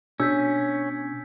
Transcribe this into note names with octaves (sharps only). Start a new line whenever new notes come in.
B2 C#4 D4 E6 G6 B6